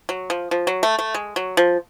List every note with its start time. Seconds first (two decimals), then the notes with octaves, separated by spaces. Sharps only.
0.09 F#3
0.30 F3
0.51 F3
0.67 F#3
0.83 A3
0.99 A3
1.14 G#3
1.36 F#3
1.57 F3